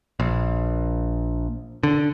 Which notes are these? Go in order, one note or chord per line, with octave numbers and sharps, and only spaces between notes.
A#1
D3